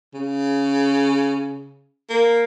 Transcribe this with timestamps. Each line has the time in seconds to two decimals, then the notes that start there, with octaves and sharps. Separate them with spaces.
0.14 C#3
2.10 A#3